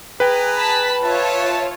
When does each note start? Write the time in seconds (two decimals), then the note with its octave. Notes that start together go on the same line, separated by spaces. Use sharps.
0.20 G#4 B4 G5 G#5 A#5
0.56 A5 B5 B6
1.03 F4 C#5 E5 A5